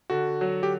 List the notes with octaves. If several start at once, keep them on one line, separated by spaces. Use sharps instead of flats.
D3 F#4
F#3
G4